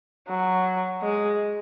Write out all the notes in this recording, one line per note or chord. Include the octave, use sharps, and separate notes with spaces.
F#3
G#3